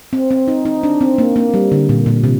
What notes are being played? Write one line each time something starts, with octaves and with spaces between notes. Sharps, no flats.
C4
C4
D#4
D#4
D4
C4
A#3
A#3
G3
D3
A#2
A#2
C3